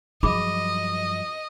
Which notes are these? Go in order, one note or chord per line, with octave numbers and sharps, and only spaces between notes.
G2 F3 F#3 F4 G#4 D#5 B5 D6